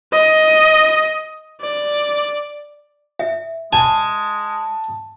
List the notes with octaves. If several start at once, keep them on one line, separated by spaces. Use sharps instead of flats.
D#5
D5
E5
G#3 G#5 A5